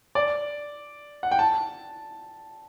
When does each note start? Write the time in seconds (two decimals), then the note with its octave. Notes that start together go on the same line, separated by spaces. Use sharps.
0.15 D5
1.23 F#5
1.32 G5
1.39 A5